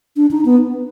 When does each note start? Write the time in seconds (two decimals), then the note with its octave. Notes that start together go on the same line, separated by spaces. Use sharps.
0.16 D4
0.31 D#4
0.45 B3